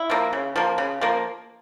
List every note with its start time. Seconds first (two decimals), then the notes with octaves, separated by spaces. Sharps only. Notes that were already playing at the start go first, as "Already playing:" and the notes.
Already playing: E4
0.10 F3 A#3
0.33 C#3
0.56 F3 A#3
0.78 C#3
1.01 F3 A#3